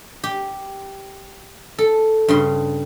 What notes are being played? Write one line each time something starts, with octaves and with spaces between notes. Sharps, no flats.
G4
A4
G2 C#3 C6